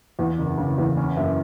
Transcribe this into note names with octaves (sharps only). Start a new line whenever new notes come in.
E2
F#1
C#3
E2
C#4
F#2